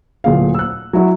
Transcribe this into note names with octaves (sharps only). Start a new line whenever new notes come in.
D1 A#2 G#4 F5
E6 F#6
F#3 E4 F#4